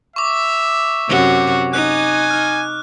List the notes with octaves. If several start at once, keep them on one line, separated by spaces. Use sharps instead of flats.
E5 C#6 D6
F#2 C3 F#4
D#4 G#5 F#6
F6